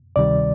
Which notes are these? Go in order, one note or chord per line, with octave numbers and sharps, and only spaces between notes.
D2 C3 D#3 G3 D5